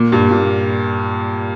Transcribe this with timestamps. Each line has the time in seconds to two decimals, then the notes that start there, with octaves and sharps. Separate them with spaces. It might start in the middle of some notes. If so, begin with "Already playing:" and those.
Already playing: A#2
0.12 G2
0.31 A#2